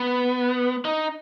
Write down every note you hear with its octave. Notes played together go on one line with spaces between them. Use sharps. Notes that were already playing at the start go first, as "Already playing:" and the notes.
Already playing: B3
D#4